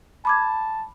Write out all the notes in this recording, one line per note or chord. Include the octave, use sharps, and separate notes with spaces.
A5 B5 D6 G#6